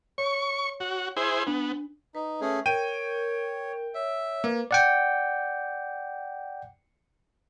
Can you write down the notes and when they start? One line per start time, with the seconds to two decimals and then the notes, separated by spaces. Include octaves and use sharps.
0.18 C#5 C#6
0.80 F#4
1.16 E4 G#4 C5
1.47 B3 D4
2.15 D#4 B4
2.41 A3 C#4 G#4
2.66 A#4 C#5 G5 D#7
3.94 C#5 E5
4.44 A#3 B4
4.71 D5 F#5 G5